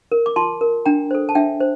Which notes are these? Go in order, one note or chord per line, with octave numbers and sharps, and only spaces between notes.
A#4
D6
F4 A5 C6
A#4
D4 G5 A#5
A4 C5
A5
D4 E5 G5
C5